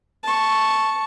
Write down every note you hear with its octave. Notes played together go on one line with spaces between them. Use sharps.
A5 C#6